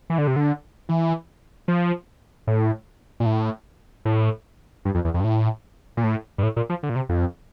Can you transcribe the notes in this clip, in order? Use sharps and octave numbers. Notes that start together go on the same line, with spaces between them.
E3
D3
C3
D3
E3
F3
A2
A#2
A2
A2
G2
F2
E2
F2
G2
A2
A#2
A2
G2
A2
A#2
F3
D3
A#2
C3
F2